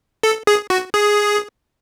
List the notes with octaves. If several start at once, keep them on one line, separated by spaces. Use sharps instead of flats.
A4
G#4
F#4
G#4